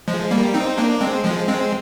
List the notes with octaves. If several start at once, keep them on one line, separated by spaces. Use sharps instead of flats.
F3 G#3
G3 A#3
C4 D#4
A#3 D4
G#3 C4
F3 G#3
G#3 C4